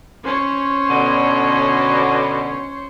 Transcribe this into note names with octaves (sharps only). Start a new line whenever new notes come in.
C#4 C5 C#5
B2 D3